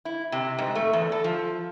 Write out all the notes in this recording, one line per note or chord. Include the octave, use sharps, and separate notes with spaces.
E4
C3
G#2
A3
E2
A4
F3